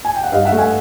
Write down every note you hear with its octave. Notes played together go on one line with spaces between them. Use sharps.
G#5
G5
F#5
G2 D#5 F5
E5 F#5
A3
F#5 G#5